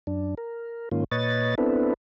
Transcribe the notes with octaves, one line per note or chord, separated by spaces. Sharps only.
F#2 D4
A#4
G#2 D#3 A#3 C#4 F4
A#2 B4 C#5 D#5 A6
B3 C4 D4 E4 A4 B4